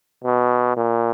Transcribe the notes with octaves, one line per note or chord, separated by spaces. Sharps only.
B2
A#2